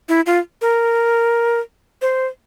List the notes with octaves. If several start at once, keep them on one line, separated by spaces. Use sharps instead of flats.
E4
F4
A#4
C5